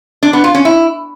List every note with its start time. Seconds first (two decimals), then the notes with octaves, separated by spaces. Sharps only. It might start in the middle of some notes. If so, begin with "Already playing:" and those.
0.23 D4
0.33 B3
0.44 F4
0.54 C#4
0.65 E4